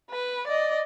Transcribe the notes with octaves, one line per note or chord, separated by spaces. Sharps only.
B4
D5 D#5